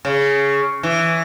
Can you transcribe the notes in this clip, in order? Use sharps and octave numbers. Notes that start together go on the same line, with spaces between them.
C#3
E3